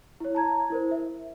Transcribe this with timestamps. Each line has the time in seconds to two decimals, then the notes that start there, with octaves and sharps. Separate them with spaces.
0.20 E4 C#5
0.35 A5 A#5 G#6
0.70 E4 A#4 C5
0.91 E5